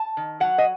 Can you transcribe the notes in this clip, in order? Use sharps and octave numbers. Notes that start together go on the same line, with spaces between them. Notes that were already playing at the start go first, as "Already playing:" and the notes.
Already playing: A5
D#3
F#3 F#5
D#5